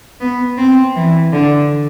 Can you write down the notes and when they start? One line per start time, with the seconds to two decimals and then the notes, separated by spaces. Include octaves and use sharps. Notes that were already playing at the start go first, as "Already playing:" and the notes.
0.20 B3
0.58 C4
0.95 E3
1.33 D3